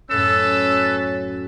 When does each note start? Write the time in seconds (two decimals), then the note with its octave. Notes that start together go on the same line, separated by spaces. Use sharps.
0.10 F#2 A2 A3 C#4 A4 B4 E6